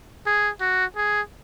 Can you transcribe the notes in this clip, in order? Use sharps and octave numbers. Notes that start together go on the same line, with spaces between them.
G#4
F#4
G#4